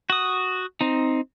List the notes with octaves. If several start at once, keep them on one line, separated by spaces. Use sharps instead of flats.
F#4 D#6
C4 D#4